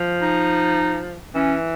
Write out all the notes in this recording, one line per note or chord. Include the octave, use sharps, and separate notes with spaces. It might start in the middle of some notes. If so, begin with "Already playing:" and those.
Already playing: F3
D#4
E3 C#4